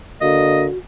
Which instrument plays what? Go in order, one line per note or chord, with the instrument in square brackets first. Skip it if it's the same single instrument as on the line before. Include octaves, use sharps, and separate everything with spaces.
[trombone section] D3 A#3 [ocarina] F#4 [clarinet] D#5